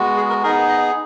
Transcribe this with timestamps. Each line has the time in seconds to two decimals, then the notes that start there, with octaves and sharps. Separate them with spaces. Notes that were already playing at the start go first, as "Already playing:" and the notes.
Already playing: G#3 B3 F#4
0.17 G#4
0.29 A#4
0.43 B3 D#4 G#4 A#4
0.69 D#5